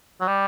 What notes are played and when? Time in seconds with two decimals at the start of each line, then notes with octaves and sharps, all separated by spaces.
0.21 F#3
0.27 G3